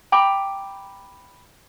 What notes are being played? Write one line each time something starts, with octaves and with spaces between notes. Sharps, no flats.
G5 A#5 B5 D6